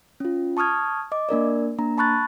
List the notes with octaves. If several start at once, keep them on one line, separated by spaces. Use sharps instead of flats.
C#4 F4
A5 C#6 D#6 F6 G#6
D#5 D6
A#3 D4 A#4 D5
A#3 D4 A#5
A5 B5 C#6 F#6 A6